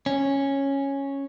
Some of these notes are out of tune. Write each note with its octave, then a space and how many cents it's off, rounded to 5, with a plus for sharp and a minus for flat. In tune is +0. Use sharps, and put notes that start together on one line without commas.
C#4 -5